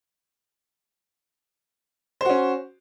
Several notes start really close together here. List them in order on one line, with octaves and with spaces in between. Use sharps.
C5 F#4 C#4